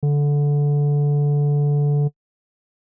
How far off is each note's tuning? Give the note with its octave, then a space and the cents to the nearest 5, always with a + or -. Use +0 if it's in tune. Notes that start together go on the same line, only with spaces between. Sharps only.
D3 -15